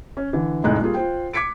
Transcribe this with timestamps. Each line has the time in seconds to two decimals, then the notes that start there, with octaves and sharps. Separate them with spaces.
0.17 C#4
0.33 D3 E3
0.64 F1 A2 G#3 D#4 A#5 F#6
0.81 G3 A#3 F4 G#4
0.94 F4 C5 G5
1.33 D6 G#6 B6 C#7 D7